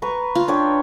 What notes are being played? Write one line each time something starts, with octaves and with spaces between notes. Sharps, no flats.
B4 A#5 C#6
F4
D4 C#5 G5